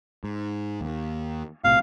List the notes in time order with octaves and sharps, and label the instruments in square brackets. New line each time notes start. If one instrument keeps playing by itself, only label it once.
[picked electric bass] G#2
D#2
[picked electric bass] B1 A2 C3 [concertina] F5